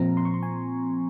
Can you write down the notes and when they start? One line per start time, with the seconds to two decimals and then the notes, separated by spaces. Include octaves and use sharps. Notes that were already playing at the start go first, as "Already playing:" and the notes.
Already playing: A#2 F3 C4 A#5
0.17 C6
0.25 C#6
0.34 C6
0.43 G#5